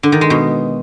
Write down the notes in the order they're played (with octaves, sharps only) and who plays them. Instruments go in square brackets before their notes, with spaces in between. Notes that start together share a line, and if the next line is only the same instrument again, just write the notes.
[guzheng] D3
D#3
G#3
B2